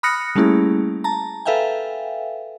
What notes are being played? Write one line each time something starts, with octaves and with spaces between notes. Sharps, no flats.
B5 D#6 F6 F#6 A#6 C#7
G3 A3 A#3 C#4 E4 G#4
A5 A#5
A4 B4 E5 F5 G5 G#5